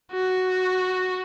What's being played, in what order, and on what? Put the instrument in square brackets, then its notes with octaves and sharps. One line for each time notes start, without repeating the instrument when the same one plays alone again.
[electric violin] F#4